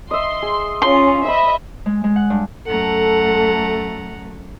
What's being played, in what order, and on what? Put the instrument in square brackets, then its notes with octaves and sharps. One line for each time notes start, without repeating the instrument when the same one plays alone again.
[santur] D#5 E5 [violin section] C6
[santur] G#4
[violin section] C#4 F4 [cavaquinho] C6
[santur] C5 B5 [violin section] D#5 E5
[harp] G#3
G#3
F#5
G2
[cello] F#2 A3 [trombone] A4 [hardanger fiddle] F#5 A#5